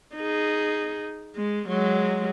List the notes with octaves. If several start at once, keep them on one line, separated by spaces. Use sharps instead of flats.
D#4 G#4
G#3
F#3 G#3